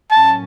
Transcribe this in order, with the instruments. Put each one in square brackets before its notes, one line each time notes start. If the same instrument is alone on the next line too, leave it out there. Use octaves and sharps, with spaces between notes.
[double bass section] A2 F#3 A#3 C#4 [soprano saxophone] A5